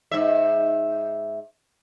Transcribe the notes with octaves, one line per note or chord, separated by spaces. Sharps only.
G#2 E5